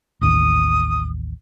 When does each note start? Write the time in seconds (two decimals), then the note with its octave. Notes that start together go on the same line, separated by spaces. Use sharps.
0.21 A1 D#2 D#6